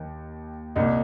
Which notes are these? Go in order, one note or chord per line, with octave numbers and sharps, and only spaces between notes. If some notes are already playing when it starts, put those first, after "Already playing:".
Already playing: D#2 D#3
C2 A#2 D#4